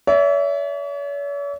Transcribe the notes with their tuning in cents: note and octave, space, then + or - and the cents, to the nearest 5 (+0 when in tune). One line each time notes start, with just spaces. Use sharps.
C#5 +45 E5 +0